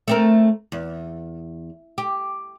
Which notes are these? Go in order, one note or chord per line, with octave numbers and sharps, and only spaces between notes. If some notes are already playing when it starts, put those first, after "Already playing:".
A3 C4 A#4
E2
G4